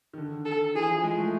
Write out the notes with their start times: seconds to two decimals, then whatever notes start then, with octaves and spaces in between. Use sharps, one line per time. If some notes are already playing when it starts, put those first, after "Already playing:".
0.13 D#3
0.18 D3
0.45 A4
0.75 E3 G#4
0.89 F3
1.03 G#3
1.18 A3